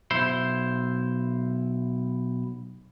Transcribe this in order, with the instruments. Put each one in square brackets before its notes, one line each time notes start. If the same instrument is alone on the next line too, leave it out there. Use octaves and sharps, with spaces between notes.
[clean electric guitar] B1 E4 C5